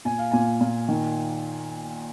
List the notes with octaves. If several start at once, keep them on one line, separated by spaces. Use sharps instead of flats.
A#2 G#5
F5
A#2 G#5
A#2
D#3